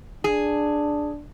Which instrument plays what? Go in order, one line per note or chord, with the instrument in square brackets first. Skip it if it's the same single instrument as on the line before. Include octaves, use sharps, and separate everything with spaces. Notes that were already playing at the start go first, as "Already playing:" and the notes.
[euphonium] D4 [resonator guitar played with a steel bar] G#4